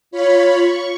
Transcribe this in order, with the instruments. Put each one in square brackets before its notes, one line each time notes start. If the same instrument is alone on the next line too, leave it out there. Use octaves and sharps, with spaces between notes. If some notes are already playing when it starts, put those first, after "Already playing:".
[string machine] F4 C#5 B5
C#6